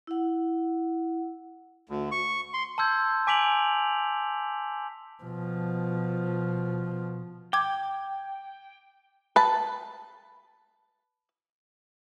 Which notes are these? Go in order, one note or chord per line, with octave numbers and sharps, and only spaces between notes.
E4 F#5
D2
C#6
C6
A5 C6 E6 G6 G#6
G#5 D6 B6 D7 F7 F#7
B2 F3
G5 D6 G#6
B4 A5